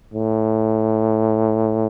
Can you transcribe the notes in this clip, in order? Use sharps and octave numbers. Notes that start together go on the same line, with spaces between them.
A2